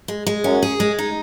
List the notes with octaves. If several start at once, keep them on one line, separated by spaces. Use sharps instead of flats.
G#3
G#3
F#2 C#4
G#4
G#3
D#4